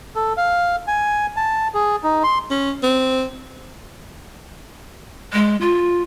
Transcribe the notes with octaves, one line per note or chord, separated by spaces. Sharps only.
A4
F5
G#5
A5
G#4
D#4
C6
C#4
C4
G#3
F4